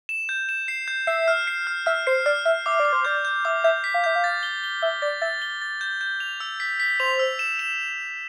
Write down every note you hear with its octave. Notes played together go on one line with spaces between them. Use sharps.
E7
G6
E7
C7
G6
E5 C7
F6
C7
F6
E5 F6
C5 C7
D5 F6
E5 F6
E5 D6
D5
D6
C5
D5 G6
G6
E5 D6
E5 G6
B6
F5
E5 G6
F5
A6
G7
G7
E5 G7
D5 A6
E5 A6
G7
A6
G6
G6
F7
E6
B6
B6
C5 F7
E6
E7
E7